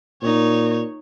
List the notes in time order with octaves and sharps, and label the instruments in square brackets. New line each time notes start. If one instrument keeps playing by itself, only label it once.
[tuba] A#2 [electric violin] D#4 C#5